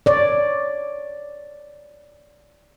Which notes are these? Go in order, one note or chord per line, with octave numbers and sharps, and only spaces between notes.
C#5 D5